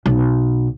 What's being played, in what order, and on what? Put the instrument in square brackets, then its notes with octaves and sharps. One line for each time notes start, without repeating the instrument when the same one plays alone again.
[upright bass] B1